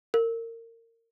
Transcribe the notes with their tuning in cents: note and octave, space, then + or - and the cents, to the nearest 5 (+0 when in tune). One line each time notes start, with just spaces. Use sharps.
A#4 -25